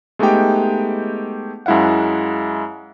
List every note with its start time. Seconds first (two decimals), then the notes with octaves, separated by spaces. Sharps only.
0.19 G#3 A3 B3 D#4 G4 G5
1.66 F#2 G#3 E4 F5 F#5